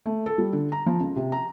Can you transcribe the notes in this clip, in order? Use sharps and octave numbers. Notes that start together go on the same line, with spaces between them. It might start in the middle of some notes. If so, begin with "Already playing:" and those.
A3
A4
G3
D3
A#5
F3
C#2
C3
A#5